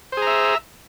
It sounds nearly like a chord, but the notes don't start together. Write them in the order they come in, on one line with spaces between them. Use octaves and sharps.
C5 G#4 A#5 E5